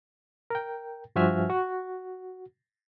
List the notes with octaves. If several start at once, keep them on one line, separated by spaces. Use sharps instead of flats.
A#4 G5
G2 F3 F#4 E5 G#5 F6
F#4